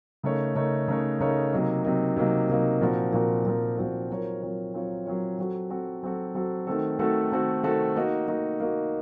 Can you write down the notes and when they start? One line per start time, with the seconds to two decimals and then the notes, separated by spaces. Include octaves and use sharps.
0.23 C#3 A3 D#4 A#4 C#5
0.55 C#3 A3 D#4 A#4 C#5
0.88 C#3 A3 D#4 A#4 C#5
1.20 C#3 A3 D#4 A#4 C#5
1.52 C3 F#3 A#3 D#4
1.84 C3 F#3 A#3 D#4
2.17 C3 F#3 A#3 D#4
2.49 C3 F#3 A#3 D#4
2.81 A#2 F3 C4 F#4 A#4
3.13 A#2 F3 C4 F#4 A#4
3.45 A#2 F3 C4 F#4 A#4
3.77 A#2 F3 C4 F#4 A#4
4.09 F#3 C4 F4 A#4 C#5
4.42 F#3 C4 F4 A#4 C#5
4.74 F#3 C4 F4 A#4 C#5
5.06 F#3 C4 F4 A#4 C#5
5.39 F#3 C4 F#4 A4
5.70 F#3 C4 F#4 A4
6.03 F#3 C4 F#4 A4
6.34 F#3 C4 F#4 A4
6.67 D#3 A3 C4 F#4 A4
6.99 D#3 A3 C4 F#4 A4
7.32 D#3 A3 C4 F#4 A4
7.63 D#3 A3 C4 F#4 A4
7.96 A#3 D#4 F#4
8.28 A#3 D#4 F#4
8.60 A#3 D#4 F#4